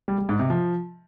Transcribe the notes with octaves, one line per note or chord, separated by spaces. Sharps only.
G3
G3
G#2
C3
F3